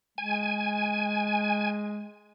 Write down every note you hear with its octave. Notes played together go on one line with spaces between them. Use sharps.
G#3 G#5